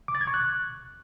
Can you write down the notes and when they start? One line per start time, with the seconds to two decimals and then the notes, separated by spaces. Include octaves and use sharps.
0.08 D6
0.15 A6
0.21 G#6
0.27 C#6
0.34 F#6